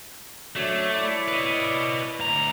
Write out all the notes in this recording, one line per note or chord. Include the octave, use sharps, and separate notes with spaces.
F#3 A3 D4 C#5
E4 C#5 D5
B4 D#5
D2 A#5